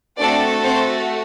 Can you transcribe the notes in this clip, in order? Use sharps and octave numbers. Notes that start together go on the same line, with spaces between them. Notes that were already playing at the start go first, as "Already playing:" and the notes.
A3 C4 D4 F#4 A4 D5
C4 C5